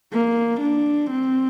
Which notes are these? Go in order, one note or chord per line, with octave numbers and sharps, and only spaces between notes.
A#3
D4
C4